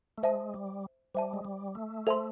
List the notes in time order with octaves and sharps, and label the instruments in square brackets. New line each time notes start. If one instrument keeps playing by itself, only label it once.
[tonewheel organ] A3
[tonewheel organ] G#3 [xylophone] C5 E5 A5
[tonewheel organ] G3
[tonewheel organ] G3 [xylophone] C5 E5 A5
[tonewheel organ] G#3
G3
A3
[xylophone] A4 C5 E5 A5 C6